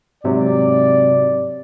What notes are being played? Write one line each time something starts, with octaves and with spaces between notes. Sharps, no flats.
G#2 C3 F#3 D5